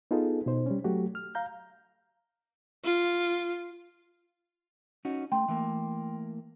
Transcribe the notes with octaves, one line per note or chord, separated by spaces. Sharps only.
B3 D#4 F4 G#4 A4
B2 D#4 C5
G3 C#4
F#3 A3 F#4 G4
F6
F5 A#5 G6
F4
C#4 D#4 F#4
A3 G5 C6
E3 A3 A#3